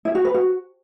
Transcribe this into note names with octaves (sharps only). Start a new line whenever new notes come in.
E4
F#4
B4
F#4